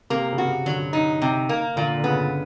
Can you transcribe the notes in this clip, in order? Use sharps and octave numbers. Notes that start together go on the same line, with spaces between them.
C3 A#3
C#3
C3 F#4
D3 F#3
D#4
C3
A#3
A#2 D3
D3
C#3 B3